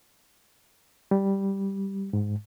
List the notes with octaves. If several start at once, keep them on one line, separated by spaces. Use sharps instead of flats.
G3
G#2